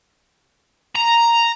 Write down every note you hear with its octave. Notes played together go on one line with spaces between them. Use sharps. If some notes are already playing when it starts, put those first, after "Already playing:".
A#5